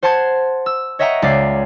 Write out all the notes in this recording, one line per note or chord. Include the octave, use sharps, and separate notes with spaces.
C5 F#5 A5 C6 G#6
E6
C#5 D#5 E5 F#5 G5 A#5
C#2 D5 C7